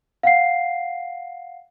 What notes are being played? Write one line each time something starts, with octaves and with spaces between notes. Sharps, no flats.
F5 F#5 C7